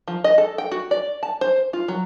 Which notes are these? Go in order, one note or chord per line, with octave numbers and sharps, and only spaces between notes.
F3
D#5
A4
G5
F#4
D5
A5
C5
F4
F#3